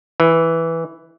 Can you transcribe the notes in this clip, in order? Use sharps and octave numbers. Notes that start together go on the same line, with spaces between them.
E3